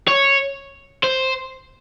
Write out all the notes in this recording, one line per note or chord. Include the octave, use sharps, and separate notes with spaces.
C#5
C5